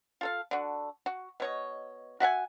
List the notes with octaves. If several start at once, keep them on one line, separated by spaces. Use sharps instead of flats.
F4 A4 F5
D3 F#4
F#4
B2 C#5 D#5
F#4 E5 F#5 G#5